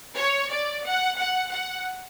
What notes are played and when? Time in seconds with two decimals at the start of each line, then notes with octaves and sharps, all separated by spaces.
0.16 C#5
0.50 D5
0.84 F#5
1.18 F#5
1.51 F#5